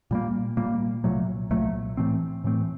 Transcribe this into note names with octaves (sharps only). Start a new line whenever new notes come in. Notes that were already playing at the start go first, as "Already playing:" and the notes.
A#2 G3 A#3
A#2 G3 A#3
C2 A#2 F#3 A3
C2 A#2 F#3 A3
A2 E3 A3 C4
A2 E3 A3 C4